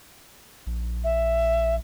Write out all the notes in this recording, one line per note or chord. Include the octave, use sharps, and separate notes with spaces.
A#1
E5